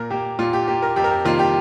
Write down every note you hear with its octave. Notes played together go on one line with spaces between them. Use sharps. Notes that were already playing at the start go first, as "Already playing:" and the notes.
Already playing: A#2 A#4
A#3 G4
A#2 F4
G4
A#3 G4
A#4
F2 G4
A#4
G4
C3 D#3 G3 A#3 F4
G4